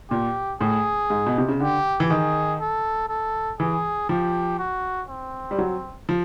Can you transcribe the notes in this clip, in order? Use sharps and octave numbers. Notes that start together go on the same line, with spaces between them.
A#2 G4
A2 G#4
G#2
B2
C3
C#3
D3 G4
E3
D#3 G#4
A4
A4
E3 G#4
F3 G4
F#4
C4
G3
F#3
F3